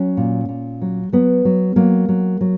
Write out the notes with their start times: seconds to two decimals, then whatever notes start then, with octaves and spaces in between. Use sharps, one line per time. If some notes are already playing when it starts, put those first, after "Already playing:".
Already playing: F#3 C#4
0.17 A#2
0.49 A#2
0.82 F#3
1.13 F#3 B3
1.45 F#3
1.76 F#3 A#3
2.09 F#3
2.41 F#3